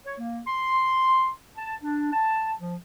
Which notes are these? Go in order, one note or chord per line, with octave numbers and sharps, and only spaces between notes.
C#5
A#3
C6
A5
D4
A5
F3